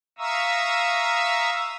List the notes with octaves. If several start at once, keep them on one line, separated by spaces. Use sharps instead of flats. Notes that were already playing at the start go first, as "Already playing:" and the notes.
E5 F5 A#5 C#6 D#6 E6